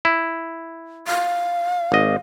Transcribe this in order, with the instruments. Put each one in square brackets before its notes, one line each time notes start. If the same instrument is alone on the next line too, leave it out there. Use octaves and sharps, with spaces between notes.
[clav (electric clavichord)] E4
[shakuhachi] F5
[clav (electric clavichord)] G#1 D#5